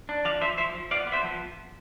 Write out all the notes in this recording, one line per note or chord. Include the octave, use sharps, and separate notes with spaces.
D4
F3 D5 F5
F3 C5 E5
F3 C5 E5
F3
B3 D5 F5
B3
C5 E5
F3